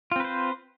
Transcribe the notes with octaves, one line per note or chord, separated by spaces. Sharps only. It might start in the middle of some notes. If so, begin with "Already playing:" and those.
C4 F4 B4 C5